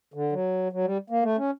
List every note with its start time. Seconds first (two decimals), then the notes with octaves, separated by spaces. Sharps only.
0.14 D3
0.32 F#3
0.72 F#3
0.84 G3
1.10 A#3
1.23 A3
1.37 C#4